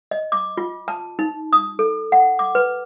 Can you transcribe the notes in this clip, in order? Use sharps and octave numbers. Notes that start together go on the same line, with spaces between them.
D#5
D6
F4
A5
D#4
D#6
A4
F#5
D6
B4